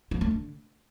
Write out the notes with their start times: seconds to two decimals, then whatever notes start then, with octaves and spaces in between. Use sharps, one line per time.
0.11 F3
0.21 A3
0.31 D3